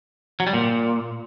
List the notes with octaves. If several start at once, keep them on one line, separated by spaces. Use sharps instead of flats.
F#3
G3
A#2